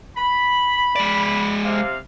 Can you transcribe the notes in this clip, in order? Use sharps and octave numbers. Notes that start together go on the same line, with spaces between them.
B5
G#3 D5
C3 F5